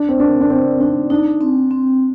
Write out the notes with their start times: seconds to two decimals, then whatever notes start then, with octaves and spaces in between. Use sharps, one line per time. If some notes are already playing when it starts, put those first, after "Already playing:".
Already playing: D4 D5
0.09 C4
0.20 D4 A#4
0.41 D4
0.50 C4 D5
0.80 D4 D#4
1.10 D4 D#4
1.41 C4
1.71 C4